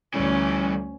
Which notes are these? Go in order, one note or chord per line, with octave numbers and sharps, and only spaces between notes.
D2 E3 G3 A3 C#4